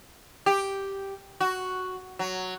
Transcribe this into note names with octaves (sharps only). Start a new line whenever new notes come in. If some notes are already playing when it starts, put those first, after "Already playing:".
G4
F#4
F#3